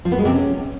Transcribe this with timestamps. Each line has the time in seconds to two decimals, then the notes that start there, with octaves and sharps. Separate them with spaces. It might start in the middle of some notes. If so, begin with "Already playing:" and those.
0.05 F3
0.12 B3
0.19 G#3
0.25 C3
0.32 C#4